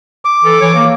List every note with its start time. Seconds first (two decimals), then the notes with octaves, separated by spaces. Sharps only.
0.25 D6
0.43 E3 A4
0.59 E3 C#5
0.73 A#3